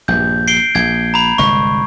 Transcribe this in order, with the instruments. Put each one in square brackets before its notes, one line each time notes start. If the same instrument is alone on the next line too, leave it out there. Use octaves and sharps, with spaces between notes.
[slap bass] A#1 G2 [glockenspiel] G6
[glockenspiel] C7 D7 G7
[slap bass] A#1 [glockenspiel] G#6
[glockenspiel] A#5 B5
[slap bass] G1 C2 G#3 [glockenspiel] C#6